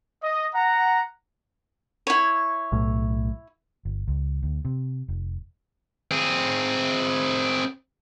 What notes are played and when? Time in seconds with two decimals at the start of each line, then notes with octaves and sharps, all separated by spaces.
0.24 D#5
0.55 F#5 A#5
2.07 E4 C#5
2.72 B1 A2
3.85 G1
4.08 C#2
4.43 D2
4.65 C3
5.08 F1
6.11 C4 G#4